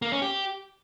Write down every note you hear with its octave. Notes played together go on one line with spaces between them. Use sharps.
A#3
C#4
G4